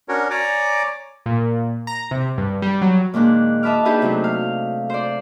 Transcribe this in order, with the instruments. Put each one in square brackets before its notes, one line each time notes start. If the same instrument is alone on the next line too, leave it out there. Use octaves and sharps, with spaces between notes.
[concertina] C#4 D4 F#4 A#4 C#5
C#5 D5 G#5 A#5 D6
[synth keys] A#2
A#5
C3
G2
G3
F#3
[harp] A#2 D#3 G#3 D4 F#6
D#5 E5 A5 B5 D6 F6
D4 D#4 G4 G#4 B4 E5
C3 F#3 A3
F5
C5 D5